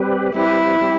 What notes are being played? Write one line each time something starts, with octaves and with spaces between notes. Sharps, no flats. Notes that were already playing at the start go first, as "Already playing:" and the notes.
Already playing: G3 C4 G4 B4
G3 C4 E4 G4 B4
G3 C4 G4